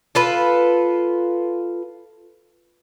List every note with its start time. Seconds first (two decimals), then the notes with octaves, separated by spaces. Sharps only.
0.15 F4 A4 B4